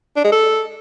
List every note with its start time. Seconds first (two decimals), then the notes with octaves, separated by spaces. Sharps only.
0.16 D4
0.24 G#3
0.32 A4